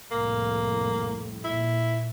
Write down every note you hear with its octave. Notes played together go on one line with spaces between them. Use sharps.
C2 F2 A2 A#3
A#2 E4